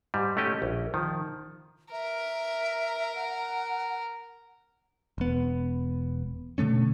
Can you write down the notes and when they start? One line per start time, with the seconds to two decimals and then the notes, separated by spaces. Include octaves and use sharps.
0.14 G#2 G3
0.37 A3 C#4 G4 D#5
0.62 A#1
0.94 D#3 F3
1.92 A#4 E5
3.15 F#5
5.18 E1 B3
6.58 B2 D3 A3 C#4